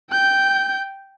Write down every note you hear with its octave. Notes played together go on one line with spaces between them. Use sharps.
G5 G6